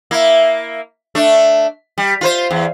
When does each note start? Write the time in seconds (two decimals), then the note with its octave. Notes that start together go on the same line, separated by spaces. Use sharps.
0.11 A#3 E4
1.15 A3 D4
1.98 G3
2.21 F4 B4 C5
2.51 E2